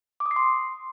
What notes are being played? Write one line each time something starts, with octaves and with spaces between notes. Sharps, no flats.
D6
D#6
C7
C6